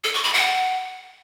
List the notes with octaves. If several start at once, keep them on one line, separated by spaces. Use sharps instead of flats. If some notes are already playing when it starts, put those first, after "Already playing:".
A4
C#6
B5
F#5